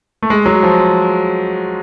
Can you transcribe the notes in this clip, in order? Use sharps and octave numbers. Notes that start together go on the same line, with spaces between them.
A3
G#3
F#3
F3